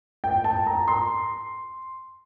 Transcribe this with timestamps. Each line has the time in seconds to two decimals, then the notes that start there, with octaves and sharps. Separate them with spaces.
0.24 G5
0.44 A5
0.67 A#5
0.88 C6